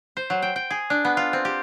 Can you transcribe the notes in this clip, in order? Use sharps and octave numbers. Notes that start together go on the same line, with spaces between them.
C5
F#3
G5
G5
G#4
D4
B3
F4
C4
G4